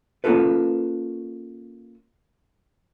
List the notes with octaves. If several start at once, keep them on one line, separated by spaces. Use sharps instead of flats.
A#3 C#4 D#4 F4 A4 B4